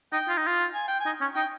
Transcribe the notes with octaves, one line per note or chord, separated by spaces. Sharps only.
D#4 G5
F4
D#4
F4
G#5
G5
G#5
D#4
C#4
D#4 G5